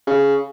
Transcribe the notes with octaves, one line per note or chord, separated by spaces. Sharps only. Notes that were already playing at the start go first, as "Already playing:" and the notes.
C#3